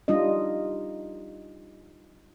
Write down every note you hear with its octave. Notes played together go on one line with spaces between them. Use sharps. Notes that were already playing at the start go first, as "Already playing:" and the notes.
G3 D4 D#4 F4 D#5